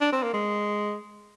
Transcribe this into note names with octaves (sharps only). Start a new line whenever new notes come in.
D4
C4
A#3
G#3